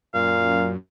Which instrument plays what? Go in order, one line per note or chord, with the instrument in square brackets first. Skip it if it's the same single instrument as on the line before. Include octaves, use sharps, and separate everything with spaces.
[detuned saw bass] F#2 [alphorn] A#2 [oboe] F5